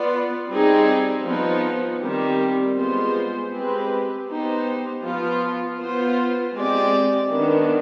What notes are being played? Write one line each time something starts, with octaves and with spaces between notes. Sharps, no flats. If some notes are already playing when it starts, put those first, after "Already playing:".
Already playing: B3 F4 B4 D5
G3 C4 D#4 G#4
F3 B3 D#4
D#3 G3 C4 G4
G#3 B3 F4 C5
G#3 C4 G4 B4
B3 D#4 G4 C5
F3 B3 F4
B3 F4 C5
G#3 C4 G4 D5
D#3 B3 D4